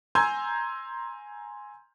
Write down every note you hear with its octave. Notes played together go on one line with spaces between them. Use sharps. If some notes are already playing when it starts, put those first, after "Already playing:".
G#5 A#5 C6 E6 G6 G#6